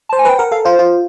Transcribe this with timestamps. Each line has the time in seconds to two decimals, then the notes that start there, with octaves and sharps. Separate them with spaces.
0.09 C5 A5
0.19 G#5
0.25 B4 G5
0.38 A#4 F#5
0.52 A4 F5
0.65 F4 C5
0.79 F4